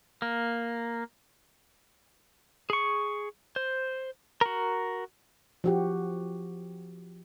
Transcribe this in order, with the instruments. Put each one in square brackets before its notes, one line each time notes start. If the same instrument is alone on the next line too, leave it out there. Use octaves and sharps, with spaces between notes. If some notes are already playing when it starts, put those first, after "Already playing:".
[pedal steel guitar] A#3
G#4 C#6
C5
F#4 A#4
[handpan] F3 F#4 G4